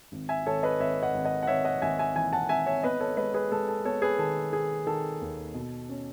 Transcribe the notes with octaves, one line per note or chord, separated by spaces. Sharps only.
G#1
E5 G#5
G#1 A4 C#5
B4 D#5
G#1 C#5 E5
D#5 F#5
G#1
D#5 F#5
F#5
G#1 C#5 E5
D#5 F#5
G#1 E5 G#5
E5 G#5
E3 E5 G#5
F#5 A5
G#1 E5 G#5
C#5 E5
B3 B4 D#5
A4 C#5
G#3 B4 D#5
G#4 B4
G#3 A4
A4
B3 A4 C#5
G#4 B4
D#3 A4
D#3 G#4
D#3 A4
D#2
B2
C#4